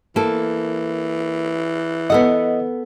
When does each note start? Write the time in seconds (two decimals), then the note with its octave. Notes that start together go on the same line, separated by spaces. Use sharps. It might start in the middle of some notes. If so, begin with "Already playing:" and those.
0.16 E3 A#3 A4
2.10 B3 A4 D#5 F#5